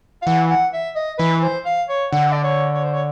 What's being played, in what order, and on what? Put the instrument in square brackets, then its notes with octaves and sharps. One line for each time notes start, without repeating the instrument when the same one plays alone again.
[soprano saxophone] F5
[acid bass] E3 [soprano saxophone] F#5
[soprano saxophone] F#5
E5
D#5
[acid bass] E3 [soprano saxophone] B4
[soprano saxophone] C5
F5
C#5
[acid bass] D3 [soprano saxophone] F#5
[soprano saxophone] D5
C#5
C#5
C5
C#5